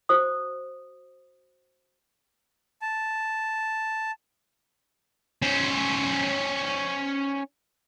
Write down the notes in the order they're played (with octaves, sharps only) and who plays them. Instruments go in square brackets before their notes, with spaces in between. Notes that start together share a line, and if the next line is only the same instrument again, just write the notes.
[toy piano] F#4 C5 D#6
[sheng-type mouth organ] A5
[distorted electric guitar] C#4 C5